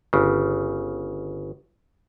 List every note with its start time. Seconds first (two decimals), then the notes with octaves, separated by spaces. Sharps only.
0.13 G1 C#3